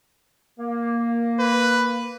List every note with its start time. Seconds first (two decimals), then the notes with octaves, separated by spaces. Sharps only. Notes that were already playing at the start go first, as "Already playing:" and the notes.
0.59 A#3
1.40 B4